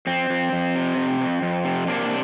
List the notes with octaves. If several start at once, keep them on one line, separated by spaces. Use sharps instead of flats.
F2 C4
F2
F2
C3
F2
F2
F2
C3
C3 A#3 D4